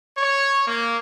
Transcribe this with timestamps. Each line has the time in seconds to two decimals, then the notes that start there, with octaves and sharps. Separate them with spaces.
0.18 C#5
0.66 A#3